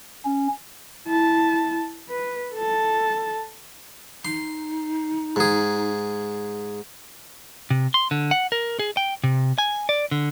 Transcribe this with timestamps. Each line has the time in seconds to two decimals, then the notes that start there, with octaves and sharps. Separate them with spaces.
0.25 C#4
1.07 E4 A5
2.09 B4
2.54 A4 A5
4.25 D#4 C6
5.36 G#2 G#4
7.70 C3
7.94 C6
8.11 D3
8.31 F#5
8.52 A#4
8.79 G#4
8.97 G5
9.24 C3
9.58 G#5
9.89 D5
10.11 D3